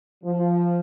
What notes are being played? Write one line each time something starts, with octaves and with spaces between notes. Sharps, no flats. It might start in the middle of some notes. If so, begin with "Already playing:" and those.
F3